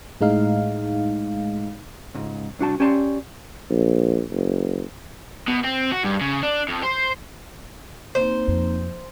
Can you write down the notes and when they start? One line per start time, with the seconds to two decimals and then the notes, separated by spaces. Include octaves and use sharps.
0.21 A2 G#3 D#4 F5
2.14 C#2 G#2
2.59 C2 D4 F#4 A5
2.80 C#4 G4 D5 A5 B5 C6
3.70 A#1
4.31 F#1
5.48 B2
5.64 C4
5.92 F#4
6.04 G2
6.21 C#3
6.43 D4
6.68 F2
6.83 C5
8.15 A#3 C4 D#4 C5
8.48 F2